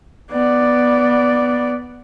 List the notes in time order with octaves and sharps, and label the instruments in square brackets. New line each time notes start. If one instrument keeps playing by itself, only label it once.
[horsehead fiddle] B3 D5